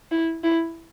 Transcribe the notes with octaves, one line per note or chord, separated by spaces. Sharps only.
E4
E4